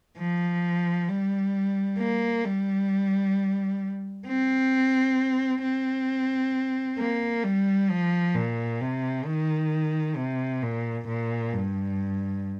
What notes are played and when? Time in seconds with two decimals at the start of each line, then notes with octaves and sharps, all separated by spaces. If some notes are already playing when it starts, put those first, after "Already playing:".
0.18 F3
1.09 G3
1.98 A#3
2.44 G3
4.27 C4
5.62 C4
6.99 A#3
7.44 G3
7.90 F3
8.35 A#2
8.81 C3
9.26 D#3
10.16 C3
10.63 A#2
11.08 A#2
11.53 G2